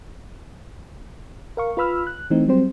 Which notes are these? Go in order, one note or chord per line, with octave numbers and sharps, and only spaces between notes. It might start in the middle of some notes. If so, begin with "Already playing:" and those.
A#4 F5 C#6
F4 B4 B5 E6 F6
F#6
E3 A3 C4 D#4
F#3 G3 C4 C5